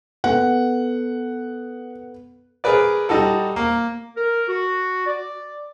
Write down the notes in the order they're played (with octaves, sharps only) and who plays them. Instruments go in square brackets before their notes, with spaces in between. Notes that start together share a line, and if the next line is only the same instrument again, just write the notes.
[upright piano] B3 A4 [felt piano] F#5
[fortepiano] G#4 A#4 B4 D5
G3 D#4 F#4 A4
A#3
[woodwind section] A#4
F#4
D5